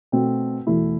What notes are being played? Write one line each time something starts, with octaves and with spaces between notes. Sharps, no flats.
B2 A3 C4
E2 B2 A3 E4